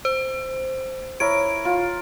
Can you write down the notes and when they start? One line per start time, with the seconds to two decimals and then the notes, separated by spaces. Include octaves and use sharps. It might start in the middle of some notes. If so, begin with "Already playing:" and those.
0.05 C5
1.20 E4 A#4 C#5 D7
1.65 F4